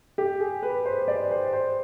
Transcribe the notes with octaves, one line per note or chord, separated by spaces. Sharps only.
G4
G#4
B4
C5
D5
C5
C5